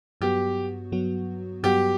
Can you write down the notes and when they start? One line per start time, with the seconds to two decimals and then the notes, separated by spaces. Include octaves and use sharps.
0.21 G2 F#3 B3 F#4 G4
0.92 G2 F#3 B3 F#4
1.63 G2 F#3 B3 F#4 G4